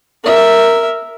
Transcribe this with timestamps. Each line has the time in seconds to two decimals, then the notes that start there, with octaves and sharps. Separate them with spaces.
0.24 A#4 E5